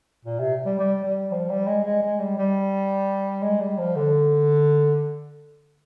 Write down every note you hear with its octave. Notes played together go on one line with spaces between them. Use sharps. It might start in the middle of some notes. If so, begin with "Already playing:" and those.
A#2
C3
G3
G3
G3
F3
G3
G#3
G#3
G#3
G3
G3
G#3
G3
F3
D3